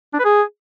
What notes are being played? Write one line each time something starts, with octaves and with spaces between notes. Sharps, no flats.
D4
B4
G#4